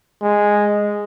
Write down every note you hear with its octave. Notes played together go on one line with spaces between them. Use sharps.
G#3